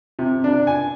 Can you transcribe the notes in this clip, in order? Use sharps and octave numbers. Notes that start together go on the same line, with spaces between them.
C3
D4
G#5